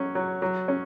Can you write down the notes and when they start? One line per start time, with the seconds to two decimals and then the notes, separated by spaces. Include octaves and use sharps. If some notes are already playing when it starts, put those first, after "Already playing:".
Already playing: F#3 C#4
0.15 F#3
0.42 F#3
0.68 C#4